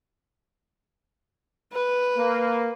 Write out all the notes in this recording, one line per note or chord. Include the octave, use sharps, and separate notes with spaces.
B4
A#3